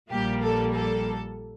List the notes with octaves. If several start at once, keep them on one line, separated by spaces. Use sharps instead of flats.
A#1 A#2 G3 A#3 G4
A4
A4